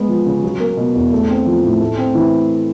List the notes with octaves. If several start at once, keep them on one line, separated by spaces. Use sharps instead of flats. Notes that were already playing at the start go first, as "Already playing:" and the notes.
Already playing: G#3 B3
F3
C#3
F#3
A#3
B2
E2
A3
C4
F3
A2
A3
C4
E3